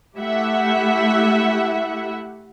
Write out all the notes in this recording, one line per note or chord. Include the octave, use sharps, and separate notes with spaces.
A3 E4 G4 E5 F#5